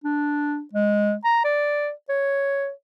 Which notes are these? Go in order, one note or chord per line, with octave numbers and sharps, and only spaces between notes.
D4
G#3
A#5
D5
C#5